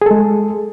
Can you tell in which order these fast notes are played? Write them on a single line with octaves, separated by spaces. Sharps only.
G#4 A4 G#3